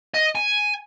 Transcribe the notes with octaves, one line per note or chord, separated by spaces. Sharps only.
D#5
G#5